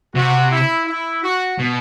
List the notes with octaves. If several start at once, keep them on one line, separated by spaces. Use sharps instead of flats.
C3 F#4
E4
E4
F#4
B2